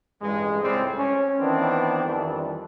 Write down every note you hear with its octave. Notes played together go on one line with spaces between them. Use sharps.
A1 G2 G#3
C#2 A2 G3 G#3 C4
C#4
D#3 E3 B3 C4 D4
F2 D#3 E3 G3 D4